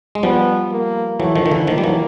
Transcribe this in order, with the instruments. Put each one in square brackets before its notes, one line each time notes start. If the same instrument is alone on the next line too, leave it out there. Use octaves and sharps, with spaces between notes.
[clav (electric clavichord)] G#3
[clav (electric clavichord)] F3 G3 [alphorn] B3
[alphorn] A#3
[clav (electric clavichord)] E3 F#3 [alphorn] A3
[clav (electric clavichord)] D#3 F3
D#3
D3 E3
[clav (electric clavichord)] D#3 F3 [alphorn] A#3
[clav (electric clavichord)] G3
E3 F#3